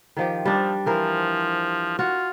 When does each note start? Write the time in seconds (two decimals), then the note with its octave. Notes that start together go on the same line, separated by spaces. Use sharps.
0.17 D#3 F3 G4
0.45 F3 G3 D4
0.86 E3 F3 A#4 C5
1.99 F4 F#4